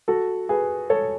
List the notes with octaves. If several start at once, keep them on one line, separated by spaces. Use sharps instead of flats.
F#4 A4
G#4 B4
A4 C#5